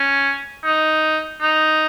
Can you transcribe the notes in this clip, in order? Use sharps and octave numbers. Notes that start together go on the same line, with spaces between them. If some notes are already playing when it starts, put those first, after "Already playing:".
Already playing: C#4
D#4
D#4